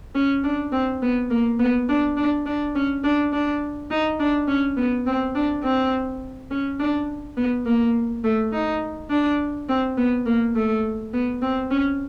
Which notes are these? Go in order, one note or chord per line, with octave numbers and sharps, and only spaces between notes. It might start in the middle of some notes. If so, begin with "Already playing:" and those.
C#4
D4
C4
B3
A#3
B3
D4
D4
D4
C#4
D4
D4
D#4
D4
C#4
B3
C4
D4
C4
C#4
D4
B3
A#3
A3
D#4
D4
C4
B3
A#3
A3
B3
C4
C#4